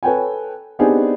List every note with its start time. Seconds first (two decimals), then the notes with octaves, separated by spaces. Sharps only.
0.03 A4 B4 C#5 G5 G#5
0.79 B3 C4 D4 D#4 G4 G#4